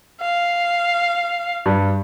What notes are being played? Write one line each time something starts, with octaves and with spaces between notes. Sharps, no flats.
F5
G2